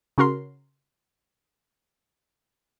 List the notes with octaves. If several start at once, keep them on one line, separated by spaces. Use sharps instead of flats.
C#3 C#4 F#4 A#4 C6